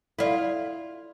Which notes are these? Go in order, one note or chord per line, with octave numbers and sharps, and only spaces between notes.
E4 F4 A4 D5 D#5